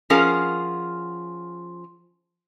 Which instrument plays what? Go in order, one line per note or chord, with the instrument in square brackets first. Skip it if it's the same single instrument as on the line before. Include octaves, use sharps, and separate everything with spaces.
[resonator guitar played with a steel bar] F3 C#4 G#4 A#4 F5 F#5